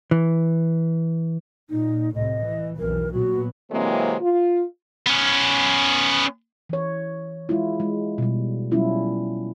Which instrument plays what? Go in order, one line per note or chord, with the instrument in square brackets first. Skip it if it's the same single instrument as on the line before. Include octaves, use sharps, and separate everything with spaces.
[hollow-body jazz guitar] E3
[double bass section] A#2 [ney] D#4
[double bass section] C2 A2 C3 [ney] D#5
[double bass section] E3
[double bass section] B1 F2 E3 [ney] A#4
[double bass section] A#2 F#3 B3 [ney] F#4
[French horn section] C3 E3 F#3 G#3 A#3 C4
F4
[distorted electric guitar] B3 C#4
[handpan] E3 C#5
G#3 E4 F4
G#3
B2 G3
F#3 G3 B3 C#4 E4 F4